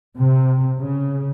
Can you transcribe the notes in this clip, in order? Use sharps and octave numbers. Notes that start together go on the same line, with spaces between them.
C3
C#3